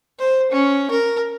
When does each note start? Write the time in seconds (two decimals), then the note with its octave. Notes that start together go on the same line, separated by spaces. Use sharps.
0.19 C5
0.52 C#4
0.91 A#4